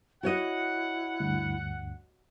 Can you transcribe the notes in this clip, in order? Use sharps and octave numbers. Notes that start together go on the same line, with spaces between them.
E4 F#4 C#5 D#5 F#5
D2 G2